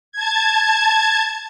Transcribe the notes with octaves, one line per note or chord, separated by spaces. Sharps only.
A5 G#6